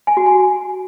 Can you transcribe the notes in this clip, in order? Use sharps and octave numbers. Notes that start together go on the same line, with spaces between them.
G#5
F#4
G#5